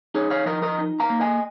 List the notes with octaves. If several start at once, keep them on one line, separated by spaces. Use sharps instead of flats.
D#4 G#4 C#5
C#5 F5
F3 A#4 D#5
A#4 D#5
D#4
F5 A#5
A#3
D#5 G#5